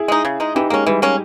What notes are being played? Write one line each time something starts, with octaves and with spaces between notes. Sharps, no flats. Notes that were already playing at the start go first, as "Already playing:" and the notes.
Already playing: E4 G#4
G#3 D#4
C#3
G#3 D#4
E3 D#4 G4
G#3 A#3 C#4
E3 G3
A#3 C#4